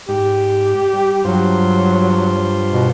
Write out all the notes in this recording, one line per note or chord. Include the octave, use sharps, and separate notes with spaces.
G#2 G4
G3
G2 F#3 F4 C5
B2